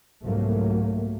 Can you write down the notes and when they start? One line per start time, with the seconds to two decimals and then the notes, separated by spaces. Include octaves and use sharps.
0.24 C2 G#2 F#3 A3 A#3